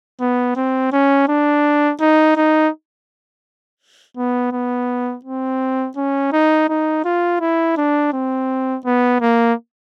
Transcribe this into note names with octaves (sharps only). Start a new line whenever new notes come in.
B3
C4
C#4
D4
D#4
D#4
B3
B3
C4
C#4
D#4
D#4
F4
E4
D4
C4
B3
A#3